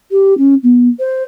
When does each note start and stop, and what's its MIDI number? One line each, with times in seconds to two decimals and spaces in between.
0.11 0.34 67
0.38 0.54 61
0.63 0.88 59
0.99 1.23 72